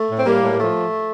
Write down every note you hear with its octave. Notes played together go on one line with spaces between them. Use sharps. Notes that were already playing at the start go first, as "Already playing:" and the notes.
Already playing: A3
A2
C4
A2 G3 A#3
A2
G3
F3 A3